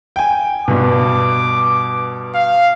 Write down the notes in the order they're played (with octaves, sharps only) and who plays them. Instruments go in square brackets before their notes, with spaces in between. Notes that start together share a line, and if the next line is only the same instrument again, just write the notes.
[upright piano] G5 G#5
[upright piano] G2 B2 [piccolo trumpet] D6
[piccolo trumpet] F5